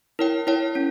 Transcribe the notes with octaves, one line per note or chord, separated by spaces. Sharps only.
E4 A#4 C#5 G5
E4 A#4 C#5 G5
C#4